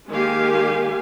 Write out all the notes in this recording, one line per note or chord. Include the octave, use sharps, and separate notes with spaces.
D#3 G#3 A#3 G4 F5 G#5